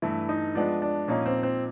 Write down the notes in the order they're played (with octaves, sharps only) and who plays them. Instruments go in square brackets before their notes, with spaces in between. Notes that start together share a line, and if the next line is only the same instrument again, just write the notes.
[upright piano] G2 E3 A3 [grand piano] E4
[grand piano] D#4
[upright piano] F3 G#3 B3 [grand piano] D4
[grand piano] D4
[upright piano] A#2 F3 A#3 D#4 [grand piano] C#4
[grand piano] C4
C4